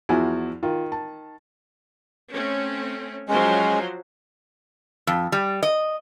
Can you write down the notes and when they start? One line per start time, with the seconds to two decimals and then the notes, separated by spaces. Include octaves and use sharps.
0.09 E2 F3 E4 F#4 G#5
0.63 D#3 F4
0.92 A5
2.32 A3 C4 C#4
3.29 F3 F#3 G#3 C#4 C5
5.07 F2
5.32 G3
5.63 D#5